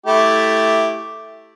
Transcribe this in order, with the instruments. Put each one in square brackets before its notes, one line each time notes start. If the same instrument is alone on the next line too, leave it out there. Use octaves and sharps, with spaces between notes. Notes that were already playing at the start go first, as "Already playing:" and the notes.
[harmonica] A3 E4 G4